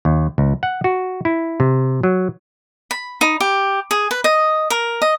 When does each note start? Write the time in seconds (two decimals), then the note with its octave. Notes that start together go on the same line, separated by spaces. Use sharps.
0.05 D#2
0.38 C#2
0.63 F#5
0.84 F#4
1.25 E4
1.60 C3
2.03 F#3
2.91 B5
3.21 D#4
3.41 G4
3.91 G#4
4.11 B4
4.24 D#5
4.70 A#4
5.02 D#5